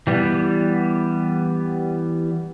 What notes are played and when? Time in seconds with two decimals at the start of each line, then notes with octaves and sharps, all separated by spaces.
0.07 E3 G3 B3